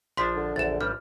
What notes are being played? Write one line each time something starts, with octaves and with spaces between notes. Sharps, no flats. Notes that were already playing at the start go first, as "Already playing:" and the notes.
A#1 F3 D4 C6 B6
D3
A#1 E2 A6 E7
A1 G3 F6